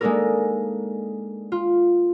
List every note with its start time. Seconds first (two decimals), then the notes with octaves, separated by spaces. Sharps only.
0.01 G#3 A#3 D4 D#4 A4 A#4
1.52 F4